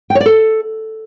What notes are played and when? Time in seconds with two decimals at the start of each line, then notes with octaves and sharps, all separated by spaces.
0.10 G5
0.15 C#5
0.20 D5
0.26 A4